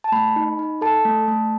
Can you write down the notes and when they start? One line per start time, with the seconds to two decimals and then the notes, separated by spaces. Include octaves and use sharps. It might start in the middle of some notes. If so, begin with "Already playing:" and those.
0.04 A5
0.12 A3 B5
0.36 D#4
0.59 D#4
0.81 A4 A5
1.05 A3
1.28 A3